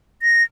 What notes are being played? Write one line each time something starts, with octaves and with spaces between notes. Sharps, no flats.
A#6